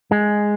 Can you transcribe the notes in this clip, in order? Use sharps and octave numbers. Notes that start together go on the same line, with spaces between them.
G#3